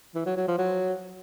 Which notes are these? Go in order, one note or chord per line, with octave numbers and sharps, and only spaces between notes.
E3
F#3
F#3
F3
F#3